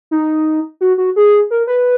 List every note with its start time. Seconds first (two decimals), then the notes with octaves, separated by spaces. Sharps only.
0.11 D#4
0.81 F#4
0.98 F#4
1.16 G#4
1.50 A#4
1.67 B4